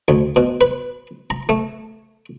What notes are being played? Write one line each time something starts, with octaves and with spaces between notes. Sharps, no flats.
D2
B2
B4
A#5
A3